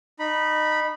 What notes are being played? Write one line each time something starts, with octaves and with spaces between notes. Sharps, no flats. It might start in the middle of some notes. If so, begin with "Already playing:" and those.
D#4 B5